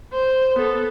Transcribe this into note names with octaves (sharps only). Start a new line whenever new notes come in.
C5
B3 A4